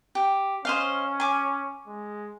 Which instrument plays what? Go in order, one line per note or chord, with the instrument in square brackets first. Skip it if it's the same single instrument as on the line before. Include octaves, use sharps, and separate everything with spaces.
[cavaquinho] G4
[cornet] C#4 [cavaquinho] C5 D#5 F5
[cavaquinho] G#5 D6
[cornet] G#3